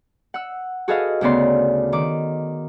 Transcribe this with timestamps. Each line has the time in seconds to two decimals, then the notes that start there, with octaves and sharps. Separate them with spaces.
0.34 F#5 E6
0.88 F#4 G#4 A4 B4 D#5 F5
1.21 D2 C#3 B3 D5 C6
1.92 D#3 D6